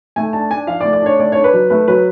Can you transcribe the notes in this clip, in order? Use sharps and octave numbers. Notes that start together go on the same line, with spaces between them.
A3 G#5
D4 A5
D4 G#5
F3 F5
A3 D5
D5
D4 C#5
A3 D5
D4 C#5
B4
F#3
A3 B4
F#3 B4